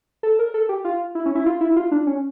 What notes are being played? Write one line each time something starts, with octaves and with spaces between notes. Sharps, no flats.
A4
A#4
A4
G4
F4
E4
C#4
E4
F4
E4
F4
D4
C#4